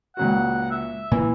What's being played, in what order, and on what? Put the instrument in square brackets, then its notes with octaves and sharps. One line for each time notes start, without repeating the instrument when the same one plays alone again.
[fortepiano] C#2 A#2 F#4 [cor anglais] F#5
[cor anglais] E5
[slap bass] A#2 C#3 A#3 [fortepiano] E3